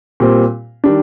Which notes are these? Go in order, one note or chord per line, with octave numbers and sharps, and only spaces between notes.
A#2 G3 C4
D#3 G3 D4